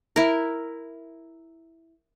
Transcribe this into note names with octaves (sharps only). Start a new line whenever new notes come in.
E4 A#4